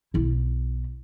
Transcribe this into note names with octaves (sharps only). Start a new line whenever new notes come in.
B1 E4